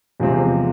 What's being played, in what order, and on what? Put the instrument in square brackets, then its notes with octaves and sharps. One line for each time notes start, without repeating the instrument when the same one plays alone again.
[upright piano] E2 C3 F3 G#3 C4